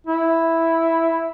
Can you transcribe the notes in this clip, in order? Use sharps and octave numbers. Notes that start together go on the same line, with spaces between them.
E4